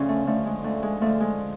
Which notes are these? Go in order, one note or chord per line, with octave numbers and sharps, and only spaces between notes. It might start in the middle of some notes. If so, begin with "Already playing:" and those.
Already playing: D2 C#3 F3 C#4
A3
D3 F3 A3
G#3
D2 A3
G#3
D3 F3 A3
G#3